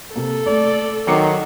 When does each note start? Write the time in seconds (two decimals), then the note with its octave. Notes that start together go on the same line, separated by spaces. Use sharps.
0.16 C3 A#3 A4
0.47 A3 D5
1.07 D#3 F#3 D6 C7 C#7